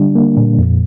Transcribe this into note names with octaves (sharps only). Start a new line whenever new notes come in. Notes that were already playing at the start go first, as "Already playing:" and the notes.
Already playing: D3 G3 D4
A#3
A#2
F2